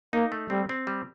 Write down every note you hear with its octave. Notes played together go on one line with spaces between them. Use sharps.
A#3 D#4
A3
G3 C4
C4
G3